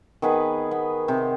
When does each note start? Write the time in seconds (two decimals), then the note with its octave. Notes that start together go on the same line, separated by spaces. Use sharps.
0.22 D#3 B3 G#4 B4
0.71 B3
1.08 C3